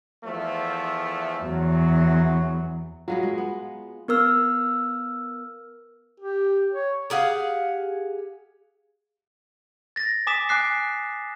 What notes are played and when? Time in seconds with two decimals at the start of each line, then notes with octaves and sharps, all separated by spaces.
0.24 E2 F3 A3
1.43 E2 F#3
3.08 F#3 G#3 B3 F4 F#4
3.23 G#3
3.38 B3
4.08 B3 A#4 E6 F6
6.20 G4
6.72 C#5
7.10 G4 G#4 F5 F#5
9.96 A6 A#6
10.27 G#5 D6 D#6 B6 E7
10.49 G#5 D6 F#6 C7